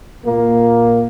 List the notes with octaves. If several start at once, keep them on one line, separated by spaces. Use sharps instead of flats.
A#2 A#3